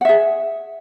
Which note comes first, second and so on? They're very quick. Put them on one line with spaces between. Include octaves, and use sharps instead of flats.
F#5 E5 G#4